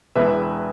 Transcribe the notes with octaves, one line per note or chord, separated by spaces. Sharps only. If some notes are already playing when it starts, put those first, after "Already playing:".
E1 E2 E3 B4 E5